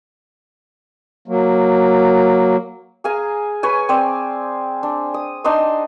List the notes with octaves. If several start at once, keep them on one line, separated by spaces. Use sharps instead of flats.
F#3 A#3
G#4 F5 G#5 A#5
B4 C#5 G#5
C4 C5 D5
D4
D#6
D4 D#4 D#5 C6